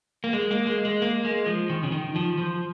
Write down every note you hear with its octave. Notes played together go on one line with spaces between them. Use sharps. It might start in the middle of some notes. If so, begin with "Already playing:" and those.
A#3
G#3
A#3
G#3
G#3
A#3
G#3
F3
D#3
C#3
D#3
F3
F3